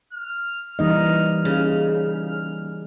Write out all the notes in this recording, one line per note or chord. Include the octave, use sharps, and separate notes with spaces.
F6
E3 G3 A#3 D#4 D#5
C#3